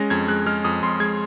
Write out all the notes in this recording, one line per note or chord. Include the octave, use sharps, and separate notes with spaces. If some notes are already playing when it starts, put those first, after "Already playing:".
Already playing: G#3 C#4 A#6
F2 G#6
G#3 F#6
G#3 F6
F2 D#6
F2 C6
G#3 G#6